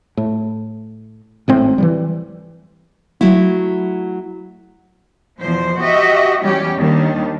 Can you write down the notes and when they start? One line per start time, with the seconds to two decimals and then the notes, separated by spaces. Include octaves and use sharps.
0.17 A2
1.48 G#1 A2 C4
1.78 E3 F3 G3
3.21 F#3 A3 E4
5.38 E2 B2 F3 C5
5.80 F#4 G4 D#5 E5
6.44 E2 G3 C#4 G4
6.79 D#2 D#3 G3 D4